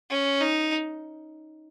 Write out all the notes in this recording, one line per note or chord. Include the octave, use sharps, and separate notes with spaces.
C#4
D#4